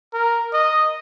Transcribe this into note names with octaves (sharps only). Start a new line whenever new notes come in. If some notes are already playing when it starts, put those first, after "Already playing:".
A#4
D#5